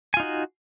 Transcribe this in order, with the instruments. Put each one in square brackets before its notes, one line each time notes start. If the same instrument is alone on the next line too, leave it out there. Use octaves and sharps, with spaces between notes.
[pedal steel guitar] G#5
F4
D#4
F#4